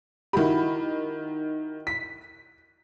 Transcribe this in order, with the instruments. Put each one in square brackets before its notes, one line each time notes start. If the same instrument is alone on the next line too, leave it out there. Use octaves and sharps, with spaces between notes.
[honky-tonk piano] D#3 B5 [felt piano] E4 F#4 G4
[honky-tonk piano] B6